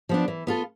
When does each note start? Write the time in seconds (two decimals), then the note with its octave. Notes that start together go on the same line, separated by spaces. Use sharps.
0.09 F3 B3 D4
0.28 E3
0.47 B3 F4 A4